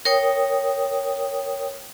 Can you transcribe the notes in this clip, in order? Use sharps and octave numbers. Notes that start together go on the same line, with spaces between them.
A#4 C#5 G5 D#6